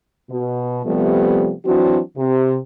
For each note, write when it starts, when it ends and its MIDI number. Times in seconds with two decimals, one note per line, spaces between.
0.30 0.80 47
0.85 1.52 48
0.85 1.52 53
0.85 1.52 55
0.85 1.52 57
0.85 1.52 59
1.65 2.00 52
1.65 2.00 54
1.65 2.00 60
1.65 2.00 62
1.65 2.00 66
2.16 2.56 48